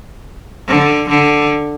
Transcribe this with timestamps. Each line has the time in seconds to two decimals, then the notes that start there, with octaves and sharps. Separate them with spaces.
0.68 D3
1.09 D3